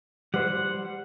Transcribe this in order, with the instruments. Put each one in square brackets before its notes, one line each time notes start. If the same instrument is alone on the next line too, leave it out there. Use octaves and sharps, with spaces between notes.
[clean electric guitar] G3 C5 [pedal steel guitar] F#5